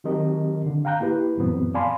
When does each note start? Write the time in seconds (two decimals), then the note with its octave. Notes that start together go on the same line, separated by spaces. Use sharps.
0.04 D#3 F#3 C4 G4 A#4 D#5
0.66 D3
0.85 F5 G5 A#5 F#6 G6
1.00 A#3 E4 G4 B4
1.37 F#2 A#2 E3 F#3 B3 C4
1.74 D5 F5 G#5 A5 B5 C6